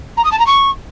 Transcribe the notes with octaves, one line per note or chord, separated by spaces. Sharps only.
A#5
D#6
A5
A#5
C#6